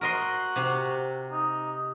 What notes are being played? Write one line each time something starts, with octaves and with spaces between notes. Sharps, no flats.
F#4 A#4 D#5 C6
C3 G4
D#4